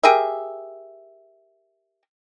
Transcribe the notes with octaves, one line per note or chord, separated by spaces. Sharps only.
G4 G#4 A#4 E5